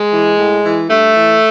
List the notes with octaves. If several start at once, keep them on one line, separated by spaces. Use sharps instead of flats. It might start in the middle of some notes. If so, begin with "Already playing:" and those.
Already playing: G#3
E3
A2
E3
G2 A3
E3